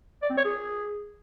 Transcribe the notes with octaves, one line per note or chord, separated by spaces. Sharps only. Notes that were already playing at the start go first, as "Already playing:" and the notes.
D5
C4
C#5
G#4